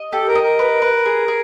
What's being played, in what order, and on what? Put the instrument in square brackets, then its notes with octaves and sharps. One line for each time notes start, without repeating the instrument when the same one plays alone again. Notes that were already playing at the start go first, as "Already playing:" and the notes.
Already playing: [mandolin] D#5
[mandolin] G4 [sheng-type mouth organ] A4
[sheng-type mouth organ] A#4
[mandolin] D#5
[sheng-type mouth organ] A#4
[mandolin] B4
B4
G#4
G#4